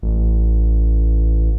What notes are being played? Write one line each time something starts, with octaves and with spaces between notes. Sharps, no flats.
A1